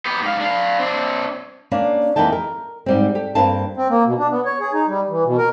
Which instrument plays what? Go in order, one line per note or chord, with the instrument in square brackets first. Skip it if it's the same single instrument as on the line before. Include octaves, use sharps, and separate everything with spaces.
[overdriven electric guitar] B3 G4
G#2 F5
D4 F5
C4 D4
[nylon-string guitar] A#3 C#4 D4
F2 E3 A#3 D#4 G5 A5
A#4
G#2 G3 C4
G4 A4
G2 A#3 C4 A5
[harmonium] C4
A#3
B2
D4
B3
C#5
G#4
D#4
G3
E3
B2
A#4